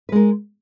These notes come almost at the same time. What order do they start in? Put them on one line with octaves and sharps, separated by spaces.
B4 G#3 A#4